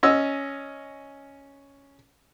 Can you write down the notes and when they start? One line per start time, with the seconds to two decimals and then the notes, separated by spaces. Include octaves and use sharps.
0.03 C#4 D#5 E6